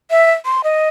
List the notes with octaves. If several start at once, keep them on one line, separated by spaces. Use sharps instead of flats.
E5
C6
D#5